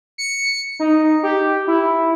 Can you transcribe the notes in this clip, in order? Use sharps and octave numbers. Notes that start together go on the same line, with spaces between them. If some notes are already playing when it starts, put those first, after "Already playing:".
C#7
D#4
G4
E4